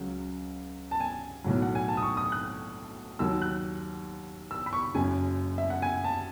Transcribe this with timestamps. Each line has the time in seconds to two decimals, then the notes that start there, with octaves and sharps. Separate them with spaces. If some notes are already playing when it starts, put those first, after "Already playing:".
Already playing: C#2 C#3 F#3
0.91 A5
1.00 G#5
1.44 B1 A2 F#3
1.62 F#5
1.75 G#5
1.88 A5
1.97 D#6
2.02 C#6
2.17 D#6
2.32 F#6
3.19 D#2 D#3 F#3 E6
3.42 F#6
4.51 E6
4.66 B5
4.73 C#6
4.95 F#1 F#2 C#3 G#5
5.58 E5
5.70 F#5
5.82 G#5
6.04 A5